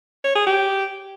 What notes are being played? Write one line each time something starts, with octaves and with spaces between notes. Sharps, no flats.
C#5
G#4
G4